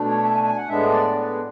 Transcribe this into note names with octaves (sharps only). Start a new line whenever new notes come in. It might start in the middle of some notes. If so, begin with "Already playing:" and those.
Already playing: B2 A3 D4
C#5
E5
G#5
G#5
F#5
A2 G#3 B3 D4 E5
D5
B4
G#4